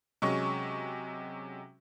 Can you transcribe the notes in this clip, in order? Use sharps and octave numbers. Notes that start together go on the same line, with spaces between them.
C3 F#3 G#3 C#4 C#6